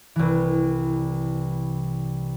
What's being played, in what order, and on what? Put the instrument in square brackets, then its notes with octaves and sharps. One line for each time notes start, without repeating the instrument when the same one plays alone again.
[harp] C2 E3